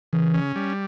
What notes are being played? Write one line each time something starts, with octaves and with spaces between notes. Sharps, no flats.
C#3 E3
C#4
G3